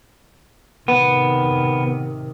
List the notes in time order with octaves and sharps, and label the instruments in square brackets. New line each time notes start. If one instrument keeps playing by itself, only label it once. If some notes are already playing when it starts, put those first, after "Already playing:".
[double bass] C3 D#3 [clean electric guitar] B3